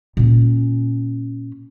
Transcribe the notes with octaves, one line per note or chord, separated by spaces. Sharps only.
A#2 C#4